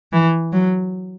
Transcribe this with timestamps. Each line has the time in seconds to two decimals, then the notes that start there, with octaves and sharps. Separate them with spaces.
0.12 E3
0.53 F#3